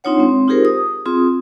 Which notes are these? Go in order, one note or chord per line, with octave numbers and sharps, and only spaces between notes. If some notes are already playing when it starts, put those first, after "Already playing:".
C4 D4 D#4 F4 C#5 F#5
G#3 C4
D#4 F4 G4 G#4 A#4 C5
D#6
C4 F4 G#4 D#6